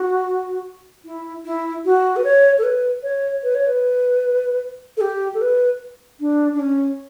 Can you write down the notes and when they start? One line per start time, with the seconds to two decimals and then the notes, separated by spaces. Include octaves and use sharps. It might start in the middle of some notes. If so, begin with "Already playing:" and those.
Already playing: F#4
1.05 E4
1.45 E4
1.85 F#4
2.16 B4
2.24 C#5
2.58 A4
2.63 B4
3.03 C#5
3.43 B4
3.55 C#5
3.67 B4
4.97 A4
5.01 G4
5.34 A4
5.41 B4
6.20 D4
6.54 D4
6.60 C#4